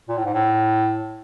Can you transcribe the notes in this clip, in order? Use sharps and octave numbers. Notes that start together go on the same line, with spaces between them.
A#2
A2
G#2
A2